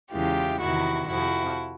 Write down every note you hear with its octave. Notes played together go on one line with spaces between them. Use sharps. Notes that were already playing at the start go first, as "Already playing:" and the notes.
E2 C#3 E3 G#3 F4 G4
E2 C3 D#3 E4 F#4
F2 C3 F3 E4 F#4